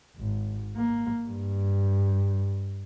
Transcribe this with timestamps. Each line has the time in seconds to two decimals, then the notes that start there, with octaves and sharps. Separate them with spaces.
0.17 G#1
0.77 A#3
1.28 G2